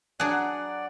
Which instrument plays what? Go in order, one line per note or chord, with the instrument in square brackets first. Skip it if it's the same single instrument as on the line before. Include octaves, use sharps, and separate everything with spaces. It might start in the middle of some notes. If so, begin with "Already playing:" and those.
[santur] F#3 F#5 [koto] D4 G#4 [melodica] D5